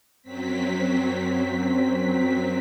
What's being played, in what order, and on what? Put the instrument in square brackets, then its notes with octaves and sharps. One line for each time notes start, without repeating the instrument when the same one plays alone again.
[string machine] F#2 F#3 C4 B6